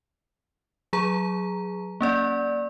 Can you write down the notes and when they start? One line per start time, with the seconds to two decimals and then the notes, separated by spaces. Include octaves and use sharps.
0.93 F#3 G#4 A#5
2.01 A#3 C#4 D5